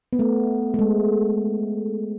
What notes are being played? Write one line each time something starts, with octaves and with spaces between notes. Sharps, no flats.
B3
A3
A3
G#3